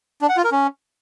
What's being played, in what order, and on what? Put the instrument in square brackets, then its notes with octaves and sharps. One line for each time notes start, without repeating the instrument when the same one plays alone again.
[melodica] D4
F#5
F4
A#4
C#4